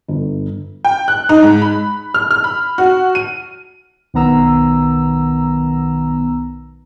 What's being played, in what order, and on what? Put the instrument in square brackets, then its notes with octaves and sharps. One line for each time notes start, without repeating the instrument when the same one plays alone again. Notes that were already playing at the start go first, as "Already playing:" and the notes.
[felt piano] G1
[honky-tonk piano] G5
F#6
D#4
G#2
B5
F6
F6
B5
F#4
D#7
[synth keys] B1 D#3 B3 A#5 E6